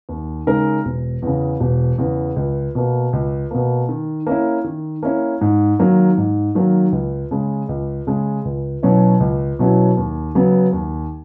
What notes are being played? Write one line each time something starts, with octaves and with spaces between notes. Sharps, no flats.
D#2
C#3 G#3 D#4 A#4
E1
E2 C#3
E1
E2 C#3
C#2
B2 A#3
C#2
B2 A#3
D#3
A#3 C#4 E4
D#3
A#3 C#4 E4
G#2
D#3 F#3 A#3
G#2
D#3 F#3 A#3
C#2
C#3 G#3
C#2
C#3 G#3
C#2
B2 F#3 C#4 E4
C#2
B2 F#3 C#4 E4
D#2
C#3 F#3 B3
D#2